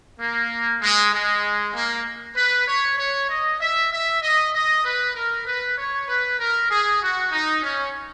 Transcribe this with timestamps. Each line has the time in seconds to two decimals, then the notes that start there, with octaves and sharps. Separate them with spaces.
0.19 A#3
0.81 G#3
1.12 G#3
1.74 A#3
2.36 B4
2.67 C#5
2.97 C#5
3.29 D#5
3.60 E5
3.91 E5
4.22 D#5
4.53 D#5
4.84 B4
5.15 A#4
5.46 B4
5.77 C#5
6.08 B4
6.39 A#4
6.70 G#4
7.01 F#4
7.32 D#4
7.62 C#4